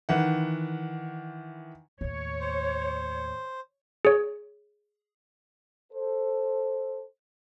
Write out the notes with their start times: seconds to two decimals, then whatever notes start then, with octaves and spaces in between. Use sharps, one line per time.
0.09 D#3 E3 F#5
2.01 D#2 A2 C#5
2.40 C5
4.05 G#4 C#5
5.93 A4 C5